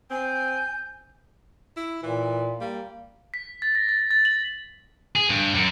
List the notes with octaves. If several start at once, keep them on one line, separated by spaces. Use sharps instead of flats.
C4 G#5 G6
E4
A#2 E3
G3 A#3
B6
A6
A#6
A6
A6
F#7
G#4
G2
F#2